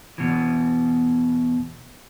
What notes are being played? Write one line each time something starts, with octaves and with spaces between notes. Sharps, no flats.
E2 B2 E3